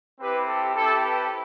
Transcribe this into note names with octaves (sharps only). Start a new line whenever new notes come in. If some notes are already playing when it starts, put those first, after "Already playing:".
C4 E4 G4 B4
A4
C4 E4 G4 A4
B4